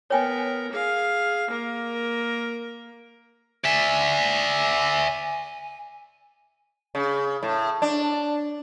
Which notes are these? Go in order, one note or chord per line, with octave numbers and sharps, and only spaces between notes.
B3 A#4 C#5 G5 G#5
G#4 F5
A#3 A#4
D5 E5 G#5
C#3
A2
D4